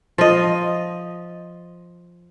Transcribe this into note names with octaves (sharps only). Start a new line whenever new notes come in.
F3 D#5